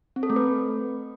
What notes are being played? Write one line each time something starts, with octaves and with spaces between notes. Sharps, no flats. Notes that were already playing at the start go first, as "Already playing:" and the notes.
C4
A4
A3
B4